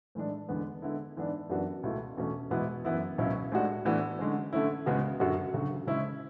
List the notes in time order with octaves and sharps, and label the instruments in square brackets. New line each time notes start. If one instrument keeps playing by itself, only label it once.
[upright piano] A2 E3 G#3 D4
E2 D3 G#3 B3
D3 G#3 B3 E4
G#2 E3 B3 D4
F#2 E3 B3 D4 F#4
C#2 B2 A3 E4
E2 B2 A3 C#4
E2 B2 G#3 B3 E4
F#2 E3 B3 E4
C#2 B2 F#3 C#4 E4
A2 G#3 D4 F#4
A2 E3 B3 D4 F#4
D3 G#3 C#4
D3 A3 C#4 E4
C#2 C#3 G#3 B3 F#4
F#2 D3 F#3 C#4 F#4
D2 C#3 F#3
C#3 G#3 C#4 E4